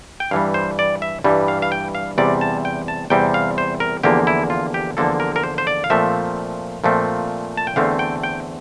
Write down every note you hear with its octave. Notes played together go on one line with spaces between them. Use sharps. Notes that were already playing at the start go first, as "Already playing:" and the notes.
G5
G2 E3 G3 F5
C5
D5
E5
G2 E3 G3
F5
F5
G5
F5
E2 C3 G3 C4 D5
A5
G5
A5
E2 C3 G3 C4 G5
F5
C5
A#4
E2 D3 F3 A#3 G4
E4
F4
G4
E2 D3 F3 A#3 A4
A#4
A#4
C5
C5
D5
F5
A#2 F3 A3 C4 E5
A#2 F3 A3 C4
A5
G5
E2 D3 A3 C4 F5
G5
G5